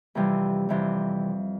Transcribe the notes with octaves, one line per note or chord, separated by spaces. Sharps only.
F2 C3 E3 G3
F2 C3 E3 G3